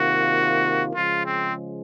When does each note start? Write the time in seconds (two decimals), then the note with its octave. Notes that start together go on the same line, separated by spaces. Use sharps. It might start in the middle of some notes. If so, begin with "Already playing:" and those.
Already playing: C3 D#3 A#3 F4 F#4
0.95 C#3 F3 G#3 F4
1.26 C4